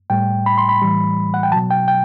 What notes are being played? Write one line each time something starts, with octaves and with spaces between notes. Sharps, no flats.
A2 G3 G5
B5
C6
B5
A2 E3 G3
F#5
G5
B2 F#3 A5
G5
G5